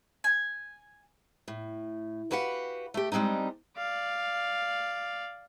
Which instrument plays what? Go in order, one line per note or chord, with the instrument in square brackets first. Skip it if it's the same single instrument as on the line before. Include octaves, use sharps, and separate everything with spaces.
[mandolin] G#5
[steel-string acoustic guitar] A2
F#4 G4 B4 F5 F#5
A3 G4
G3 G#3 C4 D4 D#4
[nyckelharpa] D5 F5